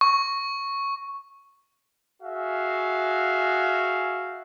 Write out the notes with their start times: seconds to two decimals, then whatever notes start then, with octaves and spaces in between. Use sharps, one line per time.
0.01 C#6
2.22 F#4 G#4 E5 F5